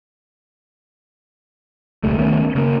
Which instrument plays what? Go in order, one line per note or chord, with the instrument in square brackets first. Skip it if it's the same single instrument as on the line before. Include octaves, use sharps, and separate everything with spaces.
[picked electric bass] E1 C#2 G3 A3
D#3 A3 B3 C#4
C#3 A#3